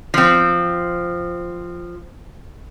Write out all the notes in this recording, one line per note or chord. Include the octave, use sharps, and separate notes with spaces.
F3 C4